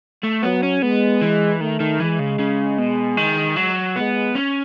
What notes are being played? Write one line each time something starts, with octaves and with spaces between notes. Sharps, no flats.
A3
F#3 B3
C#4
G#3 B3
E3
D#3 A3
D#3
E3 G#3
C#3
C#3
B2
D#3
F#3
G#3 B3
C#4